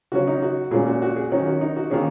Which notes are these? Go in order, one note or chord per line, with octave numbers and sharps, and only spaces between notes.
C#3 F#3 C#4 F#4
D#4
F#4
A#2 G#3 C#4 G#4
F#4
F#4
G#4
D#3 F#3 C#4 D#4
F#4
D#4
F#4
D#3 A#3 C#4 G#4